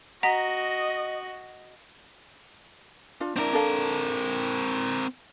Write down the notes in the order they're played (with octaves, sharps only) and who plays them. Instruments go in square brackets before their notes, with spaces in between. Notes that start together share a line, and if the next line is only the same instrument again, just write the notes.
[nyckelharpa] F#4 [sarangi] D#5 [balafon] F#5 [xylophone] A#5 A#6 B6
[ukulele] D4 F4 F5
[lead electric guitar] C4 A#4 [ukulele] D4 E4 D5
[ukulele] D4 A4 F5